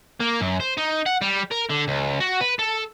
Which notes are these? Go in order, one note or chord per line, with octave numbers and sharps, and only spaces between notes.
A#3
F#2
C5
D#4
F#5
G3
A#4
D3
C#2
F#4
B4
A4